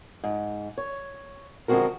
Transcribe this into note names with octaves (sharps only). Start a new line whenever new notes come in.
G#2
C#5
D3 F3 G#3 C4 F#4 A#4